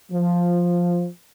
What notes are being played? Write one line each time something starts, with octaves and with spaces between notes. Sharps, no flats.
F3